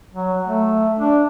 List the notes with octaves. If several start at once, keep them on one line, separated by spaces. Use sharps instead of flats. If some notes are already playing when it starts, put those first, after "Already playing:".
F#3
A3
D4